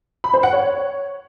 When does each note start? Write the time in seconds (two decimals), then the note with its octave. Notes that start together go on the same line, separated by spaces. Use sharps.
0.24 B5
0.34 C5
0.43 F#5
0.53 C#5